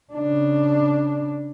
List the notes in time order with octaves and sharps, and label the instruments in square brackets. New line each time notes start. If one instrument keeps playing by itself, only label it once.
[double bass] C#3 D4